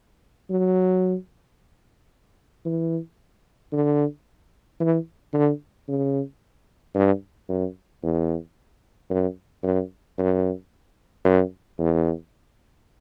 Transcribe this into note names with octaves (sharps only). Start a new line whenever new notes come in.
F#3
E3
D3
E3
D3
C#3
G2
F#2
E2
F#2
F#2
F#2
F#2
E2